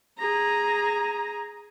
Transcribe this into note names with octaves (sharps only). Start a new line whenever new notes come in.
G#4 A#5